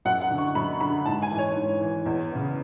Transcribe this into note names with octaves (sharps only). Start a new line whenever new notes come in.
F#2 F#5
F#5
D3
C#6
F#2 B5
D3 B5
G#2 A5
G#5
E3
C#5
G#2
E3
E2
C#3 E3